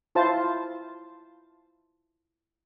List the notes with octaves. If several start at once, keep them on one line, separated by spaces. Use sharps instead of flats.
E4 F4 C5 A5